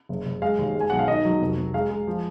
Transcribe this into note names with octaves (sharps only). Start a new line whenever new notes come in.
F#1
F#1
G#3 F5
D#2
G#3
G#5
B1 F#5
F5
D#3 D#5
F#3
F1
F1
G#3 F5
G#3
F3